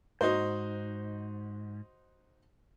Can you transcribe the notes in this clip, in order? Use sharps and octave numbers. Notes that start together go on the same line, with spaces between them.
G#2 D#4 F#4 C5